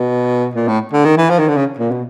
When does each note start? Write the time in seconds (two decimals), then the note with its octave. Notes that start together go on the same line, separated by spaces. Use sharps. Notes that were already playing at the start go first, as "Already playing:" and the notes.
Already playing: B2
0.55 A#2
0.68 A2
0.92 D3
1.05 D#3
1.17 E3
1.29 F3
1.39 D#3
1.48 D3
1.57 C#3
1.79 A#2
1.91 B2